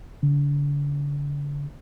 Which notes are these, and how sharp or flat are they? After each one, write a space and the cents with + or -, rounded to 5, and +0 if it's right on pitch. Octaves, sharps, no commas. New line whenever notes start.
D3 -40